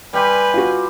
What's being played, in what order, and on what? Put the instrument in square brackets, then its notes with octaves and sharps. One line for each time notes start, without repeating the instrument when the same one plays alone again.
[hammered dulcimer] G3 G4 C6 [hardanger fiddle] B4 G#5
[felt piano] F4 F#4